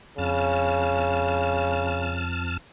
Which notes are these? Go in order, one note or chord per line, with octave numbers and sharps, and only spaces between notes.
F2 C#3 A5 F6